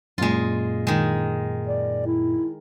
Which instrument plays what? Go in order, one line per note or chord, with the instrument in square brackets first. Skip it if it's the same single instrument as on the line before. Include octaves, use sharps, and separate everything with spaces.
[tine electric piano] F#2 A#2 [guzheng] G#3 F4
[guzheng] D#3 G#3
[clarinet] D5
E4